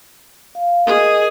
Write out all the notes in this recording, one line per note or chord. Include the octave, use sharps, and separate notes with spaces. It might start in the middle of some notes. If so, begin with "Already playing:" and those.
F5
G#4 A#4 D#5